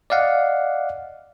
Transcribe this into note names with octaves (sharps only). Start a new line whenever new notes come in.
D5 D#5 F5 F#5